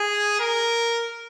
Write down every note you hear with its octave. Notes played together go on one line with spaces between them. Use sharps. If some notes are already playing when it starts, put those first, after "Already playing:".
Already playing: G#4
A#4